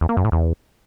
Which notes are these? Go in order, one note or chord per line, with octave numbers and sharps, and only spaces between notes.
E2
A#3
F#2
A2
E2